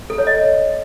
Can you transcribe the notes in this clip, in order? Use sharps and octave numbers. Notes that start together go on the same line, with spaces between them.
A4
C#5
D#5